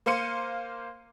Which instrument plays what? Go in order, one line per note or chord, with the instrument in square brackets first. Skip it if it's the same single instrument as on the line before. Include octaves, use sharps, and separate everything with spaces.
[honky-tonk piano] A#3 C5 F5 C6 C#7 D#7